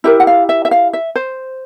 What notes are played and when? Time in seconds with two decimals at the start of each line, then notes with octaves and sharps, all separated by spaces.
0.04 E4 G4 A#4 E5
0.20 F#5
0.27 F5
0.49 E5
0.65 E5
0.71 F5
0.93 E5
1.15 C5